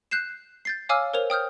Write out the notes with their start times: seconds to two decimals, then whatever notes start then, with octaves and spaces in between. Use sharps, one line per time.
0.11 F#6 G6 C7 E7
0.65 G6 A6 C7
0.89 C#5 F5 G#5 D6 E6 F6
1.14 A#4 C5 C#5 F7
1.30 G5 D#6 F6 G6